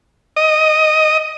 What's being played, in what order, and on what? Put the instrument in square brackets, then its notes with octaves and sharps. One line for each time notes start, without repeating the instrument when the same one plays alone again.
[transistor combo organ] D#5